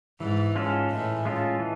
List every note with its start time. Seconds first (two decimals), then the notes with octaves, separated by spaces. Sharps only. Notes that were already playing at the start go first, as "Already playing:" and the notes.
0.20 G#2 E3
0.56 G#3 C#4 F4 A4
0.90 A2 E3
1.25 G#3 C#4 F4 A4
1.59 E3